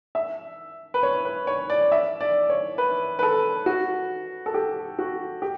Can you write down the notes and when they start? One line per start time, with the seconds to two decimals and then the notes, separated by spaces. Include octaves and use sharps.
0.15 E5
0.94 B4
1.03 C#5
1.25 B4
1.47 C#5
1.70 D5
1.92 E5
2.21 D5
2.49 C#5
2.78 B4
3.19 B4
3.23 A4
3.66 F#4
4.46 A4
4.54 G4
4.99 F#4
5.42 G4